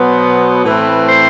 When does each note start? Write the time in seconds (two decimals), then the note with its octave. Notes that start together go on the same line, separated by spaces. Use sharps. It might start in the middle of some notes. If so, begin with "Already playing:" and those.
Already playing: B2 F#3 B3 C5
0.65 A2 E3 A3 C4 B4
1.07 C5